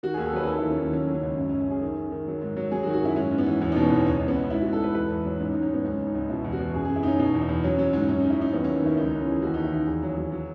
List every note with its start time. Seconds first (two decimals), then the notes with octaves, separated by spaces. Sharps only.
0.03 D#3 F#4
0.14 D#2 G#4
0.26 A4
0.33 F#3 B4
0.43 B4
0.47 D#3 A4
0.58 D#2 E4
0.70 C#4
0.78 D#2 D#4
0.92 C#3 C#4
1.07 F#3
1.15 C#4
1.23 C#2
1.37 F#2 C#4
1.49 C#4
1.52 F#2
1.60 C#4
1.67 F#2 G#4
1.82 D#3
1.97 D#3
2.12 D#3
2.27 F#3
2.41 G#2
2.57 F#3
2.71 F#3 G#4
2.83 F#4
2.86 D#3
2.93 F#4
3.02 F#2 E4
3.16 G#2 C#4
3.31 G#2
3.38 B3
3.46 E3
3.61 E2 C#4
3.72 B2 D#4
3.83 B3
3.90 E2 C#4
4.06 C#2 C#4
4.17 C#2 C#4
4.28 B3
4.35 C#3 C#4
4.50 G#2 E4
4.62 G#2 F#4
4.73 A4
4.80 G#2 B4
4.95 E2 B4
5.11 E2
5.25 F#3
5.40 G#2 C#4
5.51 G#2 D#4
5.62 C#4
5.70 G#2 B3
5.84 C#2 C#4
5.99 C#3
6.07 D#4
6.15 C#2
6.29 B2 E4
6.44 E2
6.52 F#4
6.59 B2
6.74 F#2 G#4
6.85 F#2 G#4
6.96 E4
7.03 C#3 C#4 D#4
7.19 B2 D#4
7.34 E2
7.41 D#4
7.49 E2
7.64 F#3 C#4
7.79 F#3
7.93 G#2 C#4
8.08 F#2 C#4
8.20 F#2 D#4
8.30 E4
8.38 F#2 D#4
8.53 D#2 B3
8.64 F#3 C#4
8.76 D#4
8.83 D#3 E4
8.97 C#2 D#4
9.10 C#4
9.13 C#2
9.21 C#4
9.27 E3 G#4
9.42 D#2 F#4
9.54 D#2 D#4
9.65 E4
9.72 D#2
9.87 E2 G#4
10.03 F#3
10.18 F#3
10.32 F#3